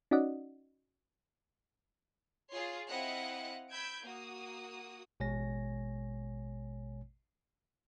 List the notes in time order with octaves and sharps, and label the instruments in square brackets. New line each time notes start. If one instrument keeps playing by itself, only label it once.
[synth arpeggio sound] C#4 D#4 F#4 D5 D#5 F#5
[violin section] F4 G#4 C#5 C6
C4 E4 D#5 F5 F#5 F#6
B5 E6 G6 G#6 D7
A#3 F#4 D#6
[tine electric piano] A1 B2 G#3 C#5 G#5 A#6